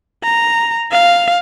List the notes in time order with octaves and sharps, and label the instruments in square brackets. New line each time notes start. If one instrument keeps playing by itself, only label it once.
[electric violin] A#5
F5